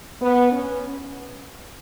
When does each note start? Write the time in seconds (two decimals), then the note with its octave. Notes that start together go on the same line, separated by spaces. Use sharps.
0.21 B3
0.52 C#4